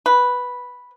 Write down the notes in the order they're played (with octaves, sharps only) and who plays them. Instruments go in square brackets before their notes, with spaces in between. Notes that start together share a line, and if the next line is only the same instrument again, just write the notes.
[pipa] B4